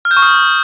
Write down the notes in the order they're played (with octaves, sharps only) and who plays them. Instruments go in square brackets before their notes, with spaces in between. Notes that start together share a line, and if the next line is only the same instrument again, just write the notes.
[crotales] F6
G6
C#6
D#6